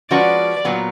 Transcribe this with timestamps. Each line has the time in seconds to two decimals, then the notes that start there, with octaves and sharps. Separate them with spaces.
0.11 F3 G#3 C#4 F#4 B4 D5
0.65 A#2 F#3 B3